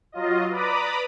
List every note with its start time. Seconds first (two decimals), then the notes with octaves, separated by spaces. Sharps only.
0.12 F#3 F4 D#5
0.50 B4 D5 A#5 B5 D6 D#6